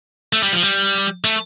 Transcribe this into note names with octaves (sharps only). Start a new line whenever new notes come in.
A3
G3
F3
G3
A3